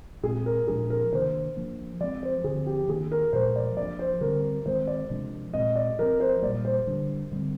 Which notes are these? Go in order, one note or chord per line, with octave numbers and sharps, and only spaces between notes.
A#2 G#3 C4 G#4
A#4
A#2 F3 G#3 D4 G#4
A#4
C3 D#3 A#3 D4 C5
F3 A#3 D4
F3 G#3 C4 D5
C5
D3 F3 C4 G#4
G4
D#3 A#3 D4 G#4
A#4
A#2 F3 G#3 C5
D5
F3 A#3 D4 D5
C5
D3 G3 C4 A#4
D#3 G#3 C4 C5
D5
C3 F3 G#3 D4
A#2 G#3 C4 D#5
D5
F3 C4 A#4
C5
A#2 G3 A#3 D5
C5
D3 G3 D4
D3 G3 C4